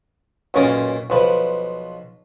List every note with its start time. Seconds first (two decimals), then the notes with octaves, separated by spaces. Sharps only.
0.54 B1 F#2 A#2 C#4 A#4 D#6
1.10 B1 F3 B4